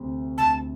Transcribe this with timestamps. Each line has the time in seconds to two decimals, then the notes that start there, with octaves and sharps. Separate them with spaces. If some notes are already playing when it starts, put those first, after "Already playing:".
Already playing: D2 C3
0.38 D2 A5